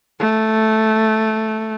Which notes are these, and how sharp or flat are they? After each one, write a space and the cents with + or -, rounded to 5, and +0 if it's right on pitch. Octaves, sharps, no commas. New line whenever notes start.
A3 -5